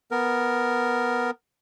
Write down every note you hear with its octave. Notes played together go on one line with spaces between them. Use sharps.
B3 A#4